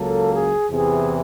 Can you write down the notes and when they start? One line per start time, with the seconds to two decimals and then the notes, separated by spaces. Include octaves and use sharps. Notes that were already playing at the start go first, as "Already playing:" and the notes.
Already playing: C#2 C#3 F#3 A#3 A4
0.31 G#4
0.69 E2 C3 E3 G#4